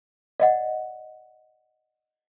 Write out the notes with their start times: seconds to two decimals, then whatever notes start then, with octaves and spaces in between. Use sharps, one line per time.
0.40 D5 D#5 F#5